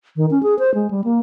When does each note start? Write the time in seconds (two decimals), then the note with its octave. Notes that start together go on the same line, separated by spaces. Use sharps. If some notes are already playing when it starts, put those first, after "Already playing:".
0.16 D#3
0.31 C#4
0.43 G#4
0.59 C5
0.75 G#3
0.91 G3
1.04 A#3